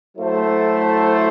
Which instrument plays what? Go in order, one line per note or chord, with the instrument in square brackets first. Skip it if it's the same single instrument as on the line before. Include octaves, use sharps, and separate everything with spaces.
[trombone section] F#3 A3 E4 A4 C5